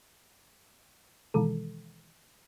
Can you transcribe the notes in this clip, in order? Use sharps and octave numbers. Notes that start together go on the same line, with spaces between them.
B2 D#3 E3 G#3 A4